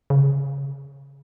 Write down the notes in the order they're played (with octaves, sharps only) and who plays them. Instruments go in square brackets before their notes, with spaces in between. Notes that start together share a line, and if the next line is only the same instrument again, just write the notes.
[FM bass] C#3